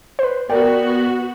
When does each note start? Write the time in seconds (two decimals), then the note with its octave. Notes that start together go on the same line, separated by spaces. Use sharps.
0.19 B4 C5
0.50 B3 F#4 A#4 D5 G5